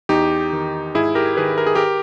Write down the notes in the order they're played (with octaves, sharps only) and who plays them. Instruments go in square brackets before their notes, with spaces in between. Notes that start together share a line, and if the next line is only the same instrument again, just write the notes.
[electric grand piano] E2 D#4 G4
D#3
G#2 E4 G#4
G4 A#4
D#3 G#4 B4
A#4
G#4
G4 A#4